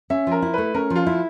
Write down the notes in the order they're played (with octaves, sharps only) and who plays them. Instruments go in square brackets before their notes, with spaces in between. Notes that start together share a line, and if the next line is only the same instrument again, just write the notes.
[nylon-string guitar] C#4 [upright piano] E5
[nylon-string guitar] F3 [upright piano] A#4
[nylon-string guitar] E4
[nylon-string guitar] A3 [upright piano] B4
[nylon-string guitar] C#4 [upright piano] A#4
[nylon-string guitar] F3
[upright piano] F4
[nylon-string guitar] E4